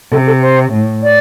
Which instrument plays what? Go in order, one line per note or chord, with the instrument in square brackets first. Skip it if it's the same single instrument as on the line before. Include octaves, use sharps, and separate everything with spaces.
[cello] C3 [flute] A4
[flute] A4
C5
[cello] A2
[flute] D5